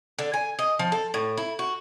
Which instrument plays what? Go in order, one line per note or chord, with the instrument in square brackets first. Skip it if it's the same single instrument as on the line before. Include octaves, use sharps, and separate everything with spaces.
[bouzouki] D3
G#5
D#5
F3
A4
A2
E4
F#4